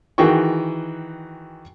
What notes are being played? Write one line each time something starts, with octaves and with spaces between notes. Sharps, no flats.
D#3 E3 F#4 G#4 G5 C#6